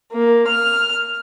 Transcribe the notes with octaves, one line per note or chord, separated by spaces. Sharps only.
A#3
F6